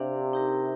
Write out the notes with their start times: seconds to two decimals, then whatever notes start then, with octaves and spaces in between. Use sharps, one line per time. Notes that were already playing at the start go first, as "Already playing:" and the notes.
Already playing: C3 D4 G4 D5 F5
0.33 D#4 G4 A#4